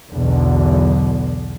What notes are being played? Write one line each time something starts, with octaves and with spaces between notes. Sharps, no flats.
B1 E2 B2 D3